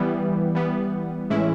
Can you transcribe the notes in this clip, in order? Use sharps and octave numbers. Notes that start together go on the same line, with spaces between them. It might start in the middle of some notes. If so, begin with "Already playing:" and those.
Already playing: E3 G3 B3
E3 G3 B3
A2 E3 G#3 C#4 E4